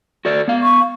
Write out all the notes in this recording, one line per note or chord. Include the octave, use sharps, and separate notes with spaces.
F#4 A4 D5
B3 F5
C#6